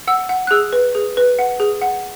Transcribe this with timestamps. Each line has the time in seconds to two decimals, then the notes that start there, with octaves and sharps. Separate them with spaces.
0.07 F#5 E6
0.29 F#5
0.47 F#6
0.51 G#4 E6
0.73 B4
0.95 G#4
1.17 B4
1.39 F#5
1.60 G#4
1.82 F#5